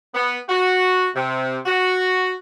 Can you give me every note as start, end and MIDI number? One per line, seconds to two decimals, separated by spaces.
0.15 0.38 59
0.49 1.07 66
1.15 1.57 48
1.66 2.33 66